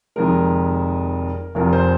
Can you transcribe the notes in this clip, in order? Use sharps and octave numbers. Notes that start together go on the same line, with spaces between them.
F1 F2 D#3 G#3 A#4
F1 F2 F3 A#4
C5